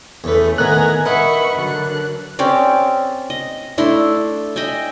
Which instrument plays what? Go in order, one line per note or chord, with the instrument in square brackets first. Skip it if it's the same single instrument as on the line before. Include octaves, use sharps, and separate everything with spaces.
[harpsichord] E2 B4 [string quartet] A3 C#4
[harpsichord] A2 D#3 B3 [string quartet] G#5 A#5 [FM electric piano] F#6
[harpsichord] D#4 F#5 [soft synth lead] A#4 [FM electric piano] B4 [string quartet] E5 B5 C#6
[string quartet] D3 F#3 F#6
[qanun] C4 C#4 G4 D5
D#5
A3 D4 E4 C6
D#5 E5 G5 G#5